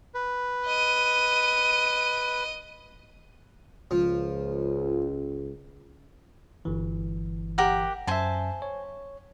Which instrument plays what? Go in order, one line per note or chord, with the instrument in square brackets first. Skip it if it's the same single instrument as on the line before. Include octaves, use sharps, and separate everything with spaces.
[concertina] B4
[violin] D#5 D#7
[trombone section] C#2 [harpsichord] F3
[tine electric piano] G1 E3
[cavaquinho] G4 A#4 F#5
[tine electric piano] F#2 E5 [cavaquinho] C5 G#5 A5
[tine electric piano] C#5